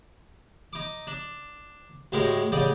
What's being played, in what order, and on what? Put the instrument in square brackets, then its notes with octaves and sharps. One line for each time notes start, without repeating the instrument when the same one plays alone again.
[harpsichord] D#4 D6
D4
D2 A2 G#3 G4 A#4
A1 C#3 G4 D5 D#5 G5